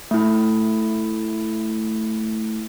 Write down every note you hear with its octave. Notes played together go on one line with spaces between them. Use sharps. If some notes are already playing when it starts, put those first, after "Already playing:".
A3 E4